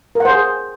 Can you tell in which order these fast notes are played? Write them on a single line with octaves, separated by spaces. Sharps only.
A#4 F#5 C5 G#4